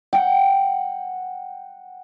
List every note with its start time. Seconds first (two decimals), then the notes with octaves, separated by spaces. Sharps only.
0.13 F#5 G5